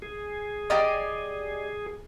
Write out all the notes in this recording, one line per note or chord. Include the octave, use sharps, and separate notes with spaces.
G#4
G4 D5 D#5